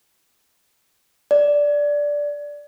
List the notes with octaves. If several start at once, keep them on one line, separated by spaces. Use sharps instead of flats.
D5